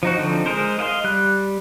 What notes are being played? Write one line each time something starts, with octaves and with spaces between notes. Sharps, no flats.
F3 D#4 F#4
D3 F3 C4 D#4
G#3 D#4 G#4 A#4 C5
D#5 F5 F#5 C6
G3 F#6